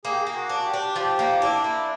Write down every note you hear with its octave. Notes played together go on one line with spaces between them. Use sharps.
A#3 G#4
G4
G#4
A#3
F#4
D4
G4
D4
F3 G4
A#3
D4 E4
A#3